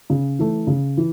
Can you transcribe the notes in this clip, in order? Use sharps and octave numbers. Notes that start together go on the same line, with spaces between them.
C#3
E3 A3
C#3
E3